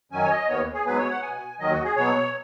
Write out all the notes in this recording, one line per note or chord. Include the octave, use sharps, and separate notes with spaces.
F#2 D#3 F#3 C#4 G#5
C#5
D#5
D#2 D#3 B3 C#5
G#4
G#2 F#3 B3 B4
C#5
F#5
B2 B3 G#5
D#2 D#3 F#3 D#5
F#4
G#4
B2 F#3 B3 C#5